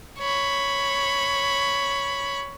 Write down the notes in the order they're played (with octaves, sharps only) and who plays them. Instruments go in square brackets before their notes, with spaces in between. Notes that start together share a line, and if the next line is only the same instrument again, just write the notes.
[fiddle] C#5 B5